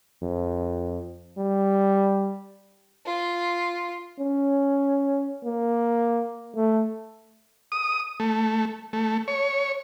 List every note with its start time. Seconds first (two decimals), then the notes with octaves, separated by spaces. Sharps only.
0.22 F2
1.38 G3
3.06 F4
4.20 C#4
5.45 A#3
6.56 A3
7.72 D#6
8.20 A3
8.93 A3
9.28 C#5